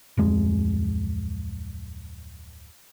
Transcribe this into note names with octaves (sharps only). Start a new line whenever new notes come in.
D1 F2 G#3